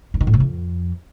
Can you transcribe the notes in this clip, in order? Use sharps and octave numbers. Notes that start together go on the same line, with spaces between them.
G2
D#3
A2
C3
F2